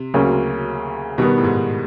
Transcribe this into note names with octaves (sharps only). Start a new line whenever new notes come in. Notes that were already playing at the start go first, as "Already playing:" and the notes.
Already playing: C3
D2 C#3 F#3 A#3 C#4
B2 D#3 G3 B3
A2
G#2